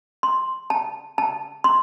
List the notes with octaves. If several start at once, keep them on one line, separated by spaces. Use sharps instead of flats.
C6
A5
A5
C6